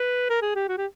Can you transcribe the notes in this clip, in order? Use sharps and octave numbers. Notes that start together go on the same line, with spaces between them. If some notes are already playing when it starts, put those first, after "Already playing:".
Already playing: B4
A#4
G#4
G4
F#4
G4